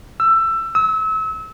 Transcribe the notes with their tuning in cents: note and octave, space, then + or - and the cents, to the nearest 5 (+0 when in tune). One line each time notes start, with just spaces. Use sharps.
E6 +20
E6 -30